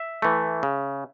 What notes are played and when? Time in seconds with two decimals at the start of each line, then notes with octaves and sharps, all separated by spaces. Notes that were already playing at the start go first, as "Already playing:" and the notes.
Already playing: E5
0.22 E3 A3
0.63 C#3